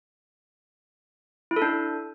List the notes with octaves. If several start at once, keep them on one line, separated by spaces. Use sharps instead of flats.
E4
A4
D4